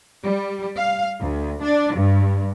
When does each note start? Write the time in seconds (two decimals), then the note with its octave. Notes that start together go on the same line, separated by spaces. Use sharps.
0.23 G3
0.76 F5
1.19 D2
1.61 D4
1.95 G2